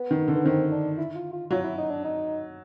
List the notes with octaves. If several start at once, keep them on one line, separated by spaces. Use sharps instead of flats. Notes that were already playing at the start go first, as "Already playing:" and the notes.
Already playing: B3
D#3
D3
B3
D#3 C4
D4
E4
F4
F4
F#3 F4
E4
D#4
D4
D#4